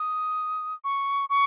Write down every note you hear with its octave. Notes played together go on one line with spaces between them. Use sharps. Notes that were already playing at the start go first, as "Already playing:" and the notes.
Already playing: D#6
C#6
C#6